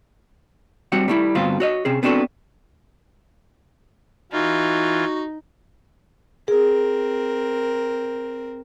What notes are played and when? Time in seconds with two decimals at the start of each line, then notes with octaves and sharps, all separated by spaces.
0.92 G3 C4 F#4 F#5
1.08 G3 A3 E4
1.35 D2 G2 B3 C4 F4 F5
1.60 F#4 C#5 D#5
1.85 C3 C4 C#4 G#4
2.03 B3 C4 D4 D#4 F#4 A4
4.32 E3 D#4 F4 F#4
6.48 C4 G#4 A#4